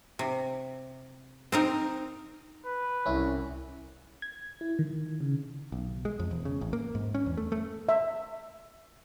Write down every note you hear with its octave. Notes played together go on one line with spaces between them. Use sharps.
C3
C4 D#4 A#4
B4
C2 C#4 E4
G#6
E4
D#3
C#3
B1
G#3
F2
E1
C#3
A1
A#3
G#2
C#4
E2
A3
A3
E5